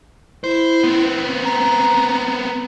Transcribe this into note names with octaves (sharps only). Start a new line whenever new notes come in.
E4 C5
B3 C4
A#5